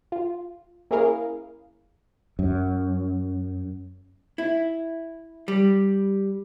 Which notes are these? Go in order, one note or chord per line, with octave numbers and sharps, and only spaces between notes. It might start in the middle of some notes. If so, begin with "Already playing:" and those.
F4
A#3 C#4 E4 G#4 A#4 F5
F#2
E4
G3